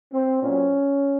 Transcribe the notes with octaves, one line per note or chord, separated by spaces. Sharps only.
C4
A#2 F#3 C#4